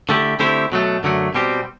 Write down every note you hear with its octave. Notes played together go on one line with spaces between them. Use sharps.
D3 A3 E4 G4
D3 A3 C4 E4 G4
B2 F#3 A3
F#2 D3 F#3 A3
B2 G3 C4 G4